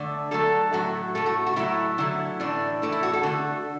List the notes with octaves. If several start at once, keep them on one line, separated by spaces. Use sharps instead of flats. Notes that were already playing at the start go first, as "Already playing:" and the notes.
Already playing: D3 A3
D3 F#3 A3 A4
A2 F#3 A3 F#4
A2 A3 A4
F#4
F#4
A2 F#3 A3 E4
D3 F#3 A3 E4
A2 E3 A3 D4
A2 E3 A3 E4
E4
F#4
A4
D3 A3 F#4